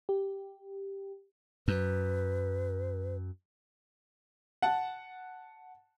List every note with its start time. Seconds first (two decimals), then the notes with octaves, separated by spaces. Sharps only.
0.09 G4
1.68 F#2 B4
4.62 F#5 A5